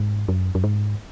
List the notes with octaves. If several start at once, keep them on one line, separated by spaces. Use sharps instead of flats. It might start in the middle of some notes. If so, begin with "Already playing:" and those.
Already playing: G#2
F#2
F#2
G#2